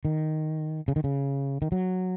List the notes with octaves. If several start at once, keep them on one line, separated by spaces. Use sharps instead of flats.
D#3
C#3
D#3
C#3
D#3
F#3